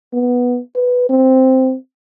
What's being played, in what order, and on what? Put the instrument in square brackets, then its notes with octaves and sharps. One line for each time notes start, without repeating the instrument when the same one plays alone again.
[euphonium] B3
B4
C4